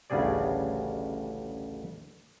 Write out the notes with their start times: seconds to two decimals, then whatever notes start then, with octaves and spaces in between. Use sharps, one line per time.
0.10 A1 D2 C#3 G3 G#4 D5